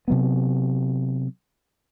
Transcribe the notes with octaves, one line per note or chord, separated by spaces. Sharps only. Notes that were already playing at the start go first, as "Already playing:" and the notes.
C3 F#3 B3